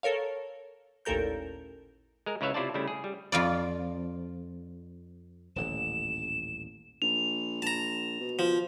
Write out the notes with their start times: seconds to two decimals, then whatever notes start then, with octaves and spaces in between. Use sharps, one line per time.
0.03 A4 A#4 C#5 F5
1.05 A1 D#2 A#2 A4 A#4 G6
2.26 G#3 A#4
2.41 C#2 E4 B4 C#5 E5 F5
2.54 C3 E4 F4 C5 D5 A5
2.74 C#3 G3 A3 E4
2.88 G#4
3.04 G3
3.32 F2 F4 D5
5.56 D#1 A1 D3 E7
7.02 A#1 F7
7.62 A#1 A5 A#5
8.20 B2
8.39 F3